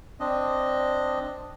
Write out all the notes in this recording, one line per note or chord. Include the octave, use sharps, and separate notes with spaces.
C4 D4 D#5